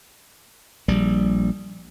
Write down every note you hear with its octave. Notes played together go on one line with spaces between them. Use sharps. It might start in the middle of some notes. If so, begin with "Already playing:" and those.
A#1 G3